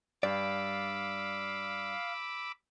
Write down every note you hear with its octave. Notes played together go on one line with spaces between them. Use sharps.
G2 D5 F5 B5 D6 E6